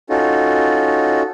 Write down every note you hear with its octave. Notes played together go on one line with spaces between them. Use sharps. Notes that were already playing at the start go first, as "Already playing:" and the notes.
C#4 D#4 F4 F#4 A4